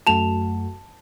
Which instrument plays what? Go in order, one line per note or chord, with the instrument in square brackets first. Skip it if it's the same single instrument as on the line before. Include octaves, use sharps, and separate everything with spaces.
[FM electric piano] F#2 A3 F#4 [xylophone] A5 F7